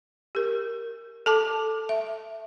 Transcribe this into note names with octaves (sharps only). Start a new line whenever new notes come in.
G4 A#4
A4 A5 D6
E5